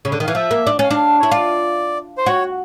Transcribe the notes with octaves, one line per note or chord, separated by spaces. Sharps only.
C#3
D3
D#3
E3 F5
F3 E5
A#3
D4
C#4 F5
D4
E4 C#5
F4 D5
C5
F#4 C#5